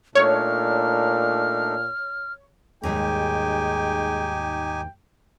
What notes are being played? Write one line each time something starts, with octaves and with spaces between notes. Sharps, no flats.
A#2 A3 D4 D#4 C#5 F6
D#2 G#2 G3 G#3 D#4 G4 G5 G#5